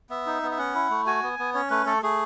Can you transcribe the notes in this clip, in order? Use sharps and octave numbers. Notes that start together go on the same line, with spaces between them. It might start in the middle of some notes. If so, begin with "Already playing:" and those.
B3 E5
D#4
B3
E5
C#4 F#5
E4
A3
F#4 G#5
B3
B3
C#4 C#5
A3 B4
A3 A4
A3 G#4